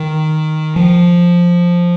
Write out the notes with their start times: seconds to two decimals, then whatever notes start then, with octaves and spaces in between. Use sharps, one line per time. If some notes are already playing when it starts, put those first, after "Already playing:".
Already playing: D#3
0.76 F3